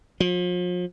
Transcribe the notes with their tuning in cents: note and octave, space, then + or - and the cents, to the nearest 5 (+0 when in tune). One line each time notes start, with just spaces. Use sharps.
F3 +40